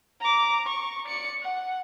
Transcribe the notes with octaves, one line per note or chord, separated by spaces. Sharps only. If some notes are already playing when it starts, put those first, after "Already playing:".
A#5 D6
C#6
D5 C#7
F#5